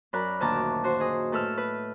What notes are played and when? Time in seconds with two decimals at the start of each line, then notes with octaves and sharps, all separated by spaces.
0.13 F#2 A#4 D5 B5 F#6
0.40 D2 A#2 D#3 A5 A#5 D6
0.84 F#4 C5
1.00 G#4 D#5
1.32 A2 A4 B4 E6 F6
1.58 B4